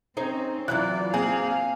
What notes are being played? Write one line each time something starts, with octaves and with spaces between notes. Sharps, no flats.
C4 C#4 D#4 G#4 C5
E3 F#3 F4 D5 F#6
A#3 C4 G#4 F5